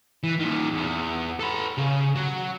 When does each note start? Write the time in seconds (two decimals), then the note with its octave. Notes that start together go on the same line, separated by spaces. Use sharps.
0.23 E3
0.40 A#2 D#3
0.74 E2
1.40 A4 B4
1.78 C#3
2.16 F#3